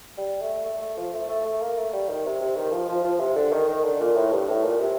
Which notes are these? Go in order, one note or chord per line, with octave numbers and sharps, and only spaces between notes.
G3
A3
A3
A3
F3
A3
A3
A3
A#3
A3
G3
D#3
C3
C3
D#3
F3
F3
F3
C3
D3
D#3
D#3
D3
A#2
A2
G2
A2
A#2
C3